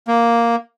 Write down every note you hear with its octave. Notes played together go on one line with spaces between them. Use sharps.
A#3